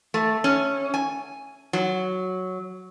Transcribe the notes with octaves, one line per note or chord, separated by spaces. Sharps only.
A3
C#4
G#5
F#3